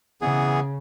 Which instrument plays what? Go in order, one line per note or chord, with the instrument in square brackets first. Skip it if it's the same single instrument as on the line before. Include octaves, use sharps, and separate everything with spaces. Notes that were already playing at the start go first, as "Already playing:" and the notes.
[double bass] C#3 [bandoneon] E3 B3 G#4